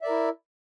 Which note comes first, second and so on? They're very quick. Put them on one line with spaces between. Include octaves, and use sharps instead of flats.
E5 D5 A#4 E4